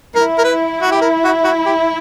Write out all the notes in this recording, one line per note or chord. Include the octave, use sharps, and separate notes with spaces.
E4 A#4
A#4
B4
F#4
G4
A#4
F#4
F#4
G4